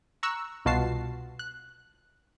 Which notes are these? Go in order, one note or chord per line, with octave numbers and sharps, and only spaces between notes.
A#5 C#6 E6 F#6
C2 B2 F4 F#4 A5 C7
F#6